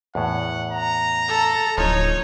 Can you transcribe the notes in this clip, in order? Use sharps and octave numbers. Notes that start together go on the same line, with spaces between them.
E2 A2 F#5
A#5
A4
D1 F3 D#4 A4 C#5